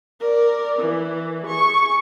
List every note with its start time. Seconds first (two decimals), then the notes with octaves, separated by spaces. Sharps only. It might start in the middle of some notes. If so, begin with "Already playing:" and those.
0.21 A#4 D5
0.79 E3
1.42 G#4 C#6